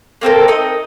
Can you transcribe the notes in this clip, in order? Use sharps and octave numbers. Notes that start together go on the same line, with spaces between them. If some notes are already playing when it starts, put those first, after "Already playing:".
A#3 C4 A4 A#4
D#4 D#5